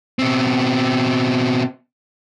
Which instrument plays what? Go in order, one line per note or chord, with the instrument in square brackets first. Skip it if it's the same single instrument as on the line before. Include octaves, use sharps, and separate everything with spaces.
[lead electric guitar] B2 C4